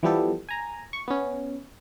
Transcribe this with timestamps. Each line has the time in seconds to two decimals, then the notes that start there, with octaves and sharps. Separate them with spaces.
0.03 E3 F3 G3 B3 G4 A4
0.49 G#5 A#5
0.93 C#6
1.08 B3 C#4